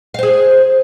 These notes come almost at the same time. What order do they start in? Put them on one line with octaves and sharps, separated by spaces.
F5 C5 G#4